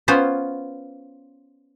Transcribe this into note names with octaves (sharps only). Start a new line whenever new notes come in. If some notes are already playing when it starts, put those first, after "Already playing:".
B3 C#4 F4 C5